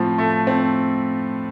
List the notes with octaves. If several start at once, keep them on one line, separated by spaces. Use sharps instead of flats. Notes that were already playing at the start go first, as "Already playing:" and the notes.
Already playing: A2 F3 C4
A3
C4